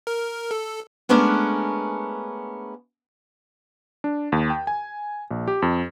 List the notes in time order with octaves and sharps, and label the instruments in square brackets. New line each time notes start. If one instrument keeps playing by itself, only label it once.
[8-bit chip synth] A#4
A4
[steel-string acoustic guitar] G#3 A3 B3 C#4 D4 A#4
[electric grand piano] D4
D#2
G5
G#5
A#1
G4
F2